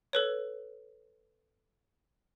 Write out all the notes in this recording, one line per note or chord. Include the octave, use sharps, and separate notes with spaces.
A4 B4 C#5